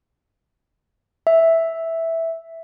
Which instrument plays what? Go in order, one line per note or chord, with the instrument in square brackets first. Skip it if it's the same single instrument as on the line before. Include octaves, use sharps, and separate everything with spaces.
[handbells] E5